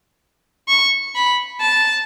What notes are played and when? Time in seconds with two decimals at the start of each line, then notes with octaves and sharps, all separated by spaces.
0.68 C#6
1.15 B5
1.61 A5